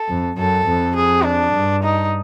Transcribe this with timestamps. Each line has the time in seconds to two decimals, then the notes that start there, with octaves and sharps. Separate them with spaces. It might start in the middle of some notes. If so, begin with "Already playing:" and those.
Already playing: A4
0.09 F2
0.38 F#2 A4
0.67 F2
0.95 G#4
1.24 D4
1.54 G2
1.83 D#4